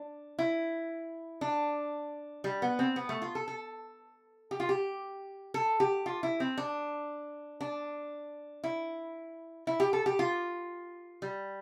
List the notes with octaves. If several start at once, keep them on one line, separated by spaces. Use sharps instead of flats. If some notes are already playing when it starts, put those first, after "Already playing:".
Already playing: D4
E4
D4
G3
B3
C4
B3
A3
F4
A4
A4
G4
F4
G4
A4
G4
F4
E4
C4
D4
D4
E4
E4
G4
A4
G4
F4
G3